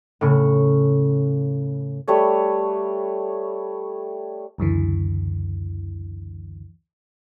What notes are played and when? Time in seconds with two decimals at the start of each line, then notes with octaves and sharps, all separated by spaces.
0.21 A2 C#3 C#6
2.08 G3 A3 B4 C#5
4.58 C#2 F#2 D3 E3